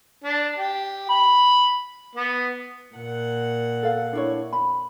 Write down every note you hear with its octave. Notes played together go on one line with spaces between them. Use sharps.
D4
G4
B5
B3
A#2 F#5
A4 F5
D4 E4 C#5
B5